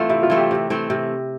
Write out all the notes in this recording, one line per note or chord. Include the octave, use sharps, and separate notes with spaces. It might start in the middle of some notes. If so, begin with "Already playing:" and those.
Already playing: E3 A3 C4 F4
C3 E4
F4
E3 A3 C4
G4
C3
E3 A3 C4
C3